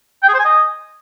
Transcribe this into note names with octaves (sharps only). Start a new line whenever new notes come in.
G5
G#4
C5
G#5
D#5